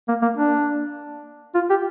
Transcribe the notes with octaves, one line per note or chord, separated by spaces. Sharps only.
A#3
A#3
D4
F4
G4